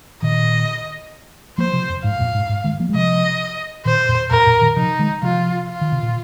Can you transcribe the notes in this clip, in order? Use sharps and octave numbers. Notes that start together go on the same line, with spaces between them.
A#2 D#3 D#5
F3 A#3 C5
C3 F3
F2
G#2 F5
F2 A#2
G#2
G#2
D#3 G#3
F3 A#3
G#3
C3 F3 D#5
A#2 D#3 C5
F2 A#2
F2 A#2 A#4
F2 A#2
A#2 D#3
C3 F3 D#4
D#3 G#3
C3 F3 F4
F4
D#3
C3
A#2